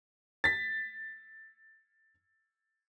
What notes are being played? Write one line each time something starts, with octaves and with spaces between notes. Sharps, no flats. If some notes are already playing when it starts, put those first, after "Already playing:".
A6 B6